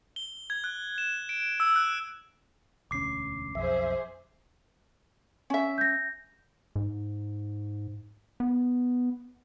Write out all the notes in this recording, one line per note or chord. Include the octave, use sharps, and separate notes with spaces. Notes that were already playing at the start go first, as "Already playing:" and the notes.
G7
G#6
F#6
E7
D7
E6
F#6
E1 D2 C#4 D6 C7
B1 F2 G#4 C5 E5
C#4 E5
G6 A#6
G#2
B3